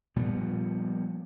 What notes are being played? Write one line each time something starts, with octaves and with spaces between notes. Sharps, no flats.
A#2 F3 G3 B3